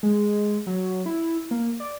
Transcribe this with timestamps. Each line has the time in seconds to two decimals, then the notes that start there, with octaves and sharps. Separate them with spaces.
0.03 G#3
0.67 F#3
1.06 E4
1.51 A#3
1.80 D5